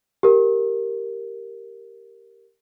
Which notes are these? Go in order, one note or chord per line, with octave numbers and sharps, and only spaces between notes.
G4 A#4